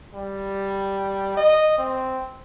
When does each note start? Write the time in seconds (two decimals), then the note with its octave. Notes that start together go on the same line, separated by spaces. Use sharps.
0.14 G3
1.37 D#5
1.78 C4